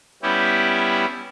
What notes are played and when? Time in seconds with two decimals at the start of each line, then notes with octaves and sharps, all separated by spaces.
0.23 G3 B3 C#4 E4 G4